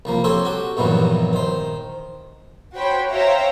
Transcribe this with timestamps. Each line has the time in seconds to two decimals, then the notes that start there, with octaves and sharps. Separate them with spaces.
0.05 C2 F3 A#3
0.24 C4 G4 A4 C5 C#5
0.45 F#4 G4
0.77 A#1 G2 B2 D#3 E3 F#3
1.33 D#3 C5
2.75 F#4 C5 C#5 G5 B5
3.09 C5 C#5 E5 F5 G5 A#5